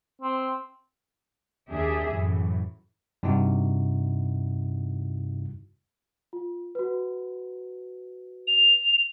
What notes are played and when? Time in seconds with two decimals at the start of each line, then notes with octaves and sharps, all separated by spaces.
0.22 C4
1.68 D#2 D4 G4 G#4 E5
2.11 F#2 A2 E3
3.23 G2 C3 G3 D#4 E4 F#4
6.33 F4
6.75 F#4 B4
8.47 F7